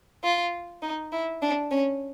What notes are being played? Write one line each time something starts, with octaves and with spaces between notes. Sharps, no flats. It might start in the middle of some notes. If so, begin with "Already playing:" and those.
F4
D#4
E4
D4
C#4